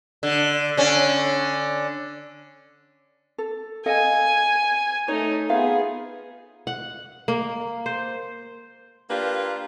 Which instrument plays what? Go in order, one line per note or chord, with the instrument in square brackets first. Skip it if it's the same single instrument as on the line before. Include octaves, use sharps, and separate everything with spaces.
[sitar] D3
D3 C#4
[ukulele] A4
[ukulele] A4 D#5 F5 [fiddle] G#5
[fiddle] A3 D#4 [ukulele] C#5
[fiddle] B3 G#4 [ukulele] F4 E5 F5
[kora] F#5
A#3
C5
[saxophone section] A#3 D4 F4 G4 B4